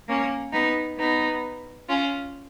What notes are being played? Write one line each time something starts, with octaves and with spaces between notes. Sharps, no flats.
A#3 C#4
B3 D#4
B3 D#4
C#4 F4